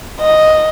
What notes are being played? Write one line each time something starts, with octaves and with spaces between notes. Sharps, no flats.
D#5